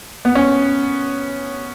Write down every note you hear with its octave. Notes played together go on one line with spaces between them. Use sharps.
B3
C#4